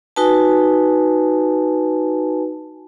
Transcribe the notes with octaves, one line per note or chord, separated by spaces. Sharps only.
D#4 F#4 B4 G#5 A5